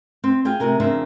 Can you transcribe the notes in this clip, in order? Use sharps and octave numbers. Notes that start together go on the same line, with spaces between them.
C4
F4 G#4 G5 G#5
C3 A3 A#4 G#5
F2 C#3 C4 D4 A#4 E5